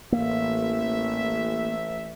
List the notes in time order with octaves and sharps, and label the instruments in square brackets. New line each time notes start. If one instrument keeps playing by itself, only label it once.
[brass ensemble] A1 E5 [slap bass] A#3